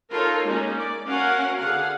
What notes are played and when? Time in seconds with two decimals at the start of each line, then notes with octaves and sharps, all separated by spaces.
0.11 D#4 F4 A4 A#4 C#5
0.45 G#3 A#3 C#4 D#4
0.75 D5
1.07 C#4 F#4 A#4 F5 F#5
1.58 D3 G#4 F5 F#5